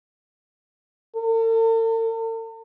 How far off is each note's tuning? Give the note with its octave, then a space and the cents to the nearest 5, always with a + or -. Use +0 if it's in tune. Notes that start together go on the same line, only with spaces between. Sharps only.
A4 +45